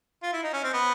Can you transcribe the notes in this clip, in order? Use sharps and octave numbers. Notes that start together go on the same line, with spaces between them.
F4
E4
D#4
C#4
C4
B3